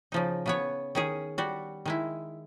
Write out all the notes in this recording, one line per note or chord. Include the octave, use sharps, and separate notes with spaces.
C#3 F3 D#4
C#3 B3 C#5
D#3 C#4 G#4
G3 F#4
D#3 G#3 E4